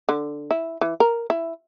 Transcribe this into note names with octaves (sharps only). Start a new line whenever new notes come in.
D3
E4
E3
A#4
E4